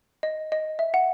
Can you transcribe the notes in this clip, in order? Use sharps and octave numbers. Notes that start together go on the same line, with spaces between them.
D#5
D#5
E5
F#5